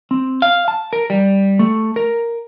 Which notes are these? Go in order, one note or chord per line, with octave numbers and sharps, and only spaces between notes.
C4
F5
A5
A#4
G3
A3
A#4